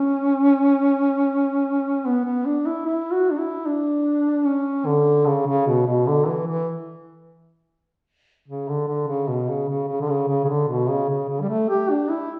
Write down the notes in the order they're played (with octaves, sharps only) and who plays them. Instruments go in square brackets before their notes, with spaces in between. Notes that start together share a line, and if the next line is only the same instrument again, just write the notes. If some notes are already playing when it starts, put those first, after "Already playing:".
Already playing: [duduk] C#4
B3
B3
D4
E4
E4
F#4
D4
E4
D4
C#4
D3
C#3
C#3
B2
B2
D3
E3
E3
C#3
D3
D3
C#3
B2
C#3
C#3
C#3
D3
C#3
C#3
C#3
D3
B2
C#3
C#3
C#3
G3
A3
G4
D4
E4